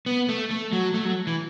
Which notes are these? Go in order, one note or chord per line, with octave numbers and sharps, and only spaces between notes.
B3
A3
A3
F#3
A3
F#3
E3